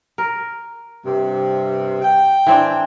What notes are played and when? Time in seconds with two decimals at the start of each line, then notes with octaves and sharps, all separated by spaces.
0.18 A#4
1.03 G2 C3
2.02 G5
2.47 E3 C4 D4